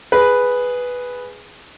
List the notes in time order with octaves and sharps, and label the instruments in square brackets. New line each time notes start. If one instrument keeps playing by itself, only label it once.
[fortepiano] G#4 B4